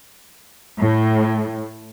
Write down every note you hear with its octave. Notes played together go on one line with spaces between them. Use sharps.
A2